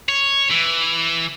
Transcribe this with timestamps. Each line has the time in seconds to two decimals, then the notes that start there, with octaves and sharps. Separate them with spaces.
0.09 C#5
0.51 E3